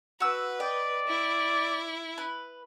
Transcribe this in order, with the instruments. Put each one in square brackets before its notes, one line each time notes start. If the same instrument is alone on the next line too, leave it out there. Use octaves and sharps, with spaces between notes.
[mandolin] F#4 E6 [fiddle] B4
[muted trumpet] D5 [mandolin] D#5 G5
[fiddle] E4
[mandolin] B4